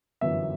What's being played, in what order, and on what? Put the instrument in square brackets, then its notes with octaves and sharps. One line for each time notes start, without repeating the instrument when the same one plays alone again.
[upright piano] G1 F#2 E3 B3 E5